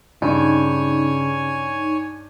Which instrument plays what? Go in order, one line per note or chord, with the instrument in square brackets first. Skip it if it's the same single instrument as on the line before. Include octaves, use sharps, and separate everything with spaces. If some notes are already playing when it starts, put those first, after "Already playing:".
[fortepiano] G2 [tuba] C#3 [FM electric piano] D#4 [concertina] C#5 G#5